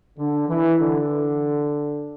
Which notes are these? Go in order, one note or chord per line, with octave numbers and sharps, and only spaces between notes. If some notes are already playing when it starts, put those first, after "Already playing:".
D3
E3
D3